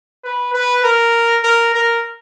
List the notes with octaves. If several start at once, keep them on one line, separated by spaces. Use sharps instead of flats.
B4
B4
A#4
A#4
A#4